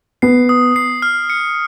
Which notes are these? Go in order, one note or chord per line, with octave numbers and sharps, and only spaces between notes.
B3 C7
D#6
C7
F6
C#7